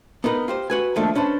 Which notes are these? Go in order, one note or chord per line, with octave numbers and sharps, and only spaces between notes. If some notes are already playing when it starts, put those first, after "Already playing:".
B3 D#4 A#4 B4
F4 G4 C5
F#4 B4 G#5
D#3 F3 A3 A#3 D4
C#4 D4 B4 C5